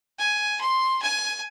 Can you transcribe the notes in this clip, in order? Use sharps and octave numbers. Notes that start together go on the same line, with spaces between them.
G#5
C6
G#5